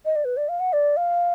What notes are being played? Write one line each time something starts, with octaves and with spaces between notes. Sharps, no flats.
D#5
D5
B4
D5
F5
F#5
D5
F5